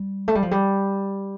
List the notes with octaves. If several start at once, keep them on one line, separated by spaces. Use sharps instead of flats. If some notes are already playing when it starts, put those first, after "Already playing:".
Already playing: G3
A3
G3
F3
G3